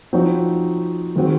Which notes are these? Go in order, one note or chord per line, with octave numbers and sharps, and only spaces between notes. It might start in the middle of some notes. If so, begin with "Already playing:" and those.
F3 C4 D#4 F#4 C#5
D#3 G#3 C4 F#4